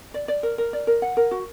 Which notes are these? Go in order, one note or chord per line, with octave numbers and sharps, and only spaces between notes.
D5
D5
A#4
A#4
D5
A#4
F#5
A#4
F#4